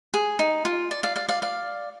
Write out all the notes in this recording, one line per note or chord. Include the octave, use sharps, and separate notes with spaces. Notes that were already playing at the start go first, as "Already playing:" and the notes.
G#4
D#4
F4
D5
D5 F5
D5 F5
D5 F5
D5 F5